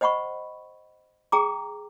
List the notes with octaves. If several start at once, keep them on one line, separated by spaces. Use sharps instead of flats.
C5 D#5 F#5 B5 C#6
G#4 G5 A#5 D6